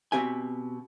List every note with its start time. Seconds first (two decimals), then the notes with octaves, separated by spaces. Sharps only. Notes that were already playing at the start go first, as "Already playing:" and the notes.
0.12 B2 C4 G4 E5 G#5